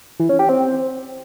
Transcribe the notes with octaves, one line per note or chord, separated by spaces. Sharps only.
E3
C#4
G4
C4